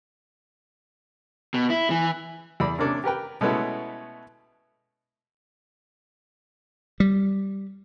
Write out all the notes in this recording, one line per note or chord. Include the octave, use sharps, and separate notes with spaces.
B2
E4
E3
E2 D5 B5
C3 A#3 C#4 D4
G4 A#4 B4 G5
B2 G#3 A3 B3 C#4 E4
G3